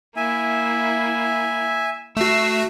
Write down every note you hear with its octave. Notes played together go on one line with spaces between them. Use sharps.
A#3 E4 E5 G#5
A3 F#4 E6 C7